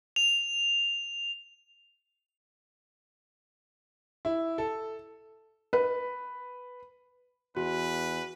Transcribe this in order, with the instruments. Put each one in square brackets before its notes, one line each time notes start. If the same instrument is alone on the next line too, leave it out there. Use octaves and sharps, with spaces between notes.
[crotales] F7
[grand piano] E4
A4
[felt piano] B4
[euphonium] E2 [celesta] F#4 [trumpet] B4